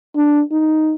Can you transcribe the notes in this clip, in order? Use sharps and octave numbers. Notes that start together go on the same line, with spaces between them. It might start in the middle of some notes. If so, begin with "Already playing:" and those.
D4
D#4